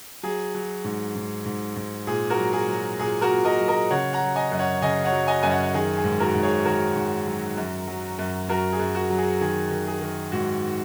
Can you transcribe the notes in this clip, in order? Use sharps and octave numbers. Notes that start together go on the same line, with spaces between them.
F#3 G#4
F#3
G#2
G#2
G#2
G#2
A#2 G#4
F#4 A#4
F#3
G#4
F#3
A#2 G#4
F#4 A#4
A#2
A#4 D#5
F#3
A#4 D#5
C#3 C#5 F#5
F#5 A#5
F#3
D#5 G#5
F#2
C#5 F#5
C#3 D#5 G#5
C#5 F#5
F#3
D#5 G#5
F#2 G#5
C#5 F#5
D#3 G#4
G#4
G#2
F#4 A#4
G#2
G#4 C#5
D#3 F#4 A#4
G#2
F#3
F#2
F#3
F#2
F#2 F#4 A#4
G#4
F#2
F#4
F#3
G#4
D#3 G#4
D#3
G#4
D#3
G#2 F#4